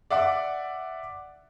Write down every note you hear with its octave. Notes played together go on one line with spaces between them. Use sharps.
D5 E5 F#5 D6